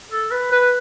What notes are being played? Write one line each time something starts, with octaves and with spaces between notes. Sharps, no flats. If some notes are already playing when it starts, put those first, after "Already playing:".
A4
B4
B4